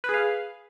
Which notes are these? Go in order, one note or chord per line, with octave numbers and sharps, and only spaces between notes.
G#4 B4 F5